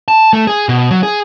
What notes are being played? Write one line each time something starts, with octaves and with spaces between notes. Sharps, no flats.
A5
A3
G#4
B2
F#3
G#4